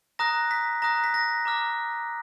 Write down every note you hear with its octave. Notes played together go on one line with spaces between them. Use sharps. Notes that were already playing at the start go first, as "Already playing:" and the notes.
A#5 D#6 F#6 A#6
B6
A#5 D#6 F#6 A#6
B6
A#6
A#5 D6 F6